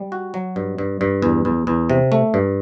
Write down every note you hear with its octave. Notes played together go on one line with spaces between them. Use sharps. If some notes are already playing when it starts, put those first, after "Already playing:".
Already playing: G3
F#4
F#3
G2
G2
G2
E2
E2
E2
C3
A3
G2